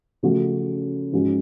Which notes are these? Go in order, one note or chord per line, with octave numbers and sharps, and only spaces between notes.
C#3 F3 A3 C#4 F#4
G#2 F3 G#3 C#4 F#4